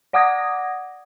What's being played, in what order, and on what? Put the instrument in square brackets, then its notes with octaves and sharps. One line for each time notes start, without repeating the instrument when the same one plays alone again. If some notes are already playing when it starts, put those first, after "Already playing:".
[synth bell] D5 F#5 D6 D#6 G#6 A#6